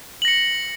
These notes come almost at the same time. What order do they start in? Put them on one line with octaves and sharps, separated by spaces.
F#7 A#6 C#7